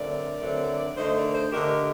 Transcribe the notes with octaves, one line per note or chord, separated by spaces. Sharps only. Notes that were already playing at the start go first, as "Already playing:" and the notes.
Already playing: D3 F#3 A3 C4 A#4 D5
D3 F#3 A3 C4
D3 A3 D#4 C5 D#5
A#4 D5
A4 C5
D3 A3 D#4 G4 A#4